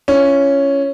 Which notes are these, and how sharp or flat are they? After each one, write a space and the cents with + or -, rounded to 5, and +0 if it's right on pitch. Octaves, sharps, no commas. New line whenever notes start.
C#4 +0 F4 -45